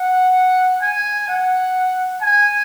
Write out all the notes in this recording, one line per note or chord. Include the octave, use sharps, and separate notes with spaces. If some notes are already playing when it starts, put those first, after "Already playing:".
Already playing: F#5
G#5
F#5
G#5